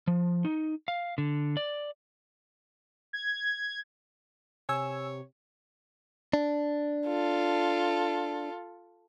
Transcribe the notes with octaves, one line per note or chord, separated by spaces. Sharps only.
F3
D#4
F5
D3
D5
G#6
C3 C#5 G#5 E6
D4
F4 A4